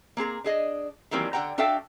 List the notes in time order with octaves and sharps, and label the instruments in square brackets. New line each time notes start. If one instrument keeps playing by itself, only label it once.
[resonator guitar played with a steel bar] A#3 C4 G#4 A#5
D4 G#4 D#5
D#3 E3 F#3 G3 A#3 C4
D3 A#4 F#5 G5 A#5
D4 F#4 A4 E5 F5 G5